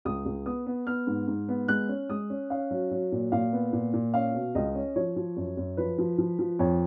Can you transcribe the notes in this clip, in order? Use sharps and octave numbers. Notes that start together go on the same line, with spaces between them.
C#2 D#6
C#2
B3 D#6
B3
B3 F6
G#2
G#2
B3
G#3 F#6
C#4
G#3 D#6
C#4
C#4 F5
F#3
F#3
A#2
A#2 F5
B3
A#2
A#2
C#4 F5
B2
C#2 D#5
C#4
F3 C#5
F3
F#2
F#2
F3 B4
F3
F3
F3
F2 C#5